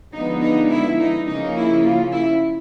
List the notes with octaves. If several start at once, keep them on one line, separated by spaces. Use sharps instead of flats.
D3 F3 G#3 B3 D#4
D#4
E4
D#4
C#3 F3 A#3 C#4 D#4
E4
F4
E4